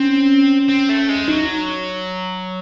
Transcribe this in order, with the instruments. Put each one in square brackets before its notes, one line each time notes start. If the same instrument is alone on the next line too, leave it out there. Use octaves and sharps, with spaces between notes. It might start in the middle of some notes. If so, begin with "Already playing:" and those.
Already playing: [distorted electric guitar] C4 [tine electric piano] C#4
[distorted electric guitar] C4
A3
G#3
[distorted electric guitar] F#3 [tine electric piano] D#4